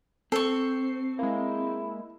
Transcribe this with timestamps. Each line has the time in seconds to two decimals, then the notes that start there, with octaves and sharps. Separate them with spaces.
0.32 C4 A4 C#6 C7
1.19 G#3 A#3 E4